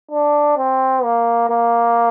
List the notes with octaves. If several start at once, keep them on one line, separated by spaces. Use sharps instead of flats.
D4
C4
A#3
A#3